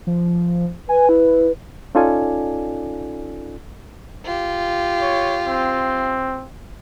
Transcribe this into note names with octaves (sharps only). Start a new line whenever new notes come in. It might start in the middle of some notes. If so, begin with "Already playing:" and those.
F3
B4 G#5
E4
C#4 D#4 F4 A4 D5 G#5
F4 G4
C#5
C4